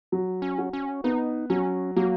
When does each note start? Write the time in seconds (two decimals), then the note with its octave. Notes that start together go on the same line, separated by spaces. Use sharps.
0.12 F#3
0.42 C#4
0.58 F#4
0.73 C#4
1.04 B3 D#4
1.50 F#3 C#4
1.96 F#3 A#3